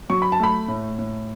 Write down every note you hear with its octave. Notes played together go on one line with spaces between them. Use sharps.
F#3 C#6
B5
A5
A3 B5
A2
A2